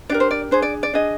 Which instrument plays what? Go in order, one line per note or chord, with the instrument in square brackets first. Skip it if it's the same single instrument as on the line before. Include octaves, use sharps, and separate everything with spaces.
[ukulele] D4 G4 A#4 D5
C5
D5
D4 G#4 C5
D5
D5
D4 G#4 D#5